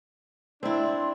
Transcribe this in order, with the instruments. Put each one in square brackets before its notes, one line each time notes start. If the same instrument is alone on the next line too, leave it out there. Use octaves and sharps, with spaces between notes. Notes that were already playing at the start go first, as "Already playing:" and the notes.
[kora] C4 E4 [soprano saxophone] D4 [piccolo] C6